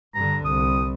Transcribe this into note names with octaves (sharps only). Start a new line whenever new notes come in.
G2 D3 A#5
C2 D#6